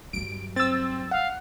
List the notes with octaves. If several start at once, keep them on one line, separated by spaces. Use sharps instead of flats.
G2 F#3 D7
C4 E6 A6
F5 F#5